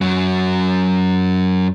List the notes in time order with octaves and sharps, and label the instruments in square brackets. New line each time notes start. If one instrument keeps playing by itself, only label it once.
[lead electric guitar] F#2 F#3